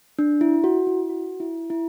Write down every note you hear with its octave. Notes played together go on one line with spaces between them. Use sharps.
D4
E4
F#4
E4
F#4
E4
E4